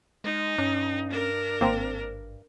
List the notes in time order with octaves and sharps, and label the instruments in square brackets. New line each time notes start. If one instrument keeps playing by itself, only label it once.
[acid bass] G#3 [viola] D#4
[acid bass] G2 [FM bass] C#4
[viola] D4 A#4
[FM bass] G#1 [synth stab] A#3 C4